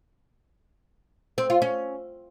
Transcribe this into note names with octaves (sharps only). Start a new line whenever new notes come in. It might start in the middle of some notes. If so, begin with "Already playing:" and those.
C4
F4
C#4